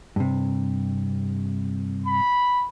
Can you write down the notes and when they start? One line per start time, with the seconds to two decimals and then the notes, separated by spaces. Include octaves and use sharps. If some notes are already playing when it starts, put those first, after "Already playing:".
0.16 G2 C3
2.07 B5